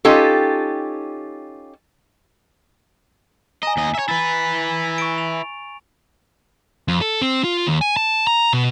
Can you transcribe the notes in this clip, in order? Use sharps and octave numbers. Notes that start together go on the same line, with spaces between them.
C#4 D#4 F4 G4 A4
D#5 G#5 A#5
D#2 D#5
C#5 E5
E4 B4 A6
C#6 D7
F7
F2
A4
C4
F4
D#2
G#5
A5
A#5
B2